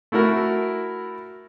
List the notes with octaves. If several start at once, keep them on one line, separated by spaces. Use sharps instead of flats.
A3 E4 F#4 A#4